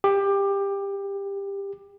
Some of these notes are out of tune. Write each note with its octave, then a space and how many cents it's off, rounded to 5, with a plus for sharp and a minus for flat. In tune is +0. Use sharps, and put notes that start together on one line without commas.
G4 +20